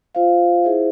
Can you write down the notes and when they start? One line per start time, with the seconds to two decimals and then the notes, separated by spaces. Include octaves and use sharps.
0.15 F4 C5 F5
0.64 E4 G#4 C5 E5